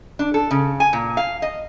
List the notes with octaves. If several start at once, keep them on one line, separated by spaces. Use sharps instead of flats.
D4
A4
C#3
G#5
A#2
F5
D#5